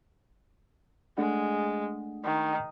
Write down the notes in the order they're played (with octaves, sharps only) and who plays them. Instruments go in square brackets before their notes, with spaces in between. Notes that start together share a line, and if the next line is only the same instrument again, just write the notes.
[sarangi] G#3 [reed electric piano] A3 D4 F#5
[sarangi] D#3